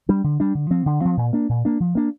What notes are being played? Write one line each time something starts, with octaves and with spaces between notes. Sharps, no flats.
G3 D4
D3
G3 D4
D3
F3 C4
D3
F3 C4
A#2
A#3 D4
A#2
A#3 D4
F3
A#3 D4